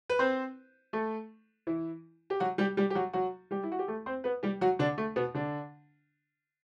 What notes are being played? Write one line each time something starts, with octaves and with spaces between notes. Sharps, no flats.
B4
C4 C5
A3 A4
E3 E4
G4
F#3 F#4
G3 G4
G3 G4
G4
F#3 F#4
F#3 F#4
G3 G4
E4
F#4
G4
A3 A4
C4 C5
B3 B4
G3 G4
F#3 F#4
D3 D4
A3
B2 B3
D3 D4